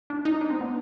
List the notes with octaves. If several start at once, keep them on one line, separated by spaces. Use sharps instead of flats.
D4
D#4
D4
C4
B3